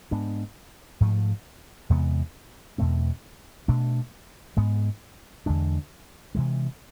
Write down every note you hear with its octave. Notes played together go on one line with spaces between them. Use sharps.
G#2 G#3 B3 D4
G#2 F3 A3
E2 C3 G#3 B3
E2 B2 A3 C4
B2 A3 D4
G#2 G#3 B3
E2 D3 G#3 D4
C3 E3 G#3